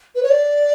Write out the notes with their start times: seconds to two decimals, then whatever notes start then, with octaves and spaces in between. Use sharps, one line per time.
0.15 B4
0.23 C#5
0.30 D5